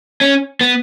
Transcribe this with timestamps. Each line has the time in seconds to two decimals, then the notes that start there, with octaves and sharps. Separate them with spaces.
0.21 C#4
0.61 B3